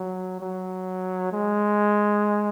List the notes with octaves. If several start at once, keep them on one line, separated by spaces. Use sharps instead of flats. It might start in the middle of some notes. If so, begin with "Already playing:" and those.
Already playing: F#3
F#3
G#3